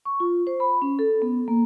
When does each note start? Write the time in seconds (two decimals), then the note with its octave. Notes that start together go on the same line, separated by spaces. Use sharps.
0.05 C#6
0.20 F4
0.47 C5
0.60 B5
0.82 C#4
0.99 A4
1.22 B3
1.48 A#3